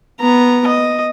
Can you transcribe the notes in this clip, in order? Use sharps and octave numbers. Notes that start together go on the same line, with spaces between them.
B3 A#5
D#5